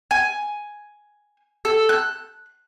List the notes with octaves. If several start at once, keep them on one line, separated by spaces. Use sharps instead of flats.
G#5
A4
F#6